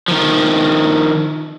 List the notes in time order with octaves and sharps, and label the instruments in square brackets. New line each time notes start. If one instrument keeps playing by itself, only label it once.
[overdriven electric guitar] D#3 F3